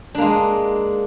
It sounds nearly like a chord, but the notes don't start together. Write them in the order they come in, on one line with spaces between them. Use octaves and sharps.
D4 A#3 G#3